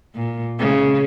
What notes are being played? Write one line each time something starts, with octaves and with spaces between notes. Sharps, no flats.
A#2
C#3